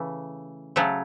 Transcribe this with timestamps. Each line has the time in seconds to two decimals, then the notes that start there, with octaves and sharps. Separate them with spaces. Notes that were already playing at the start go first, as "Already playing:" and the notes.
Already playing: C#3 E3 A3
0.76 C#3 F#3 A3